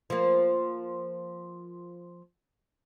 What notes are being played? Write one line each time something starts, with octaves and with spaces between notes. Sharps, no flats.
F3 A#3